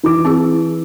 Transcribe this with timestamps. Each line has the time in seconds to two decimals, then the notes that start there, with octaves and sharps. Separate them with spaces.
0.03 E3 D6
0.25 C4 E4 G#4